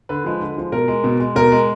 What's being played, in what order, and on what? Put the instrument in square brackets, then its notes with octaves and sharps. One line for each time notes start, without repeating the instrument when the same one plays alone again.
[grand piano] D3 B4
F3 G#3
D3
F3 G#3
B2 A#4
G#3
B2
G#3
B2 A#4
G#3